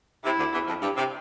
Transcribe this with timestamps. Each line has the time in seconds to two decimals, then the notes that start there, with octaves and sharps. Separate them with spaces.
0.24 C3 E4
0.38 D2 D3
0.53 E2 E3
0.67 F2 F3
0.81 G2 G3
0.96 C3 C4